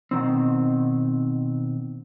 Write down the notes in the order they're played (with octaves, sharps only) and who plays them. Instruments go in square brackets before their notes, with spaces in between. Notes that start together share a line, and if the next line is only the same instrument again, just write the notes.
[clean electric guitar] B2 D#3 C4